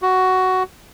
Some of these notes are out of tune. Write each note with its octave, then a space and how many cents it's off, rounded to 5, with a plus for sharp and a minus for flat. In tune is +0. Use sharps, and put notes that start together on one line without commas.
F#4 +10